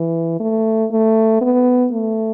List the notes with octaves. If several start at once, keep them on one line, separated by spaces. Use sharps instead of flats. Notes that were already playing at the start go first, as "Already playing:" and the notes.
Already playing: E3
A3
A3
B3
A3